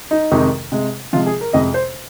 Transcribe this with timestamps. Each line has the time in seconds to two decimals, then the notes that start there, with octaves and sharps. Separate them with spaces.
0.11 D#4
0.31 F2 C3 D#3 G#3
0.72 C3 G#3
1.13 C3 F3 G#3 F4
1.26 G#4
1.41 A#4
1.53 F2 C3 G#3 D#5
1.74 C5